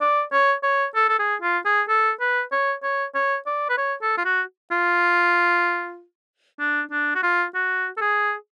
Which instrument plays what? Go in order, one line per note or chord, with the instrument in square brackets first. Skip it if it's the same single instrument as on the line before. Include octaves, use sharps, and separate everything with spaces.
[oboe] D5
C#5
C#5
A4
A4
G#4
F4
G#4
A4
B4
C#5
C#5
C#5
D5
B4
C#5
A4
F4
F#4
F4
D4
D4
F#4
F4
F#4
A4
G#4